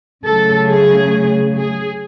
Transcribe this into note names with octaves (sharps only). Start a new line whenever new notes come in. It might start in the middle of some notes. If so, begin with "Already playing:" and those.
C#3 F#3 A3 A4
G#4
G#4